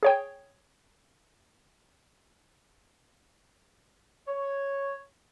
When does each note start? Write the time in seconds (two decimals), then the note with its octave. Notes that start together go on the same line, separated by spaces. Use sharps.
0.03 G#4 C#5 G5
4.28 C#5